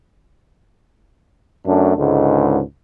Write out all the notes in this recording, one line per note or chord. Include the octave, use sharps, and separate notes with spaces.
F#2 A3 D4
C#2 G#2 D3